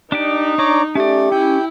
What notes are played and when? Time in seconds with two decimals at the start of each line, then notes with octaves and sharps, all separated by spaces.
0.12 D4 D#4 G4 D5
0.58 D4 C#5 D5 A#5 D6
0.95 A3 C#4 G4 D5
1.32 C#4 E4 G5